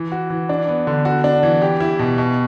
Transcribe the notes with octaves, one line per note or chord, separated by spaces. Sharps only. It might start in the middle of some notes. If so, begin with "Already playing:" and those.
Already playing: E3
F#4
E3
D4
B3
D3
F#4
D4
E3
G4
E4
B2
B2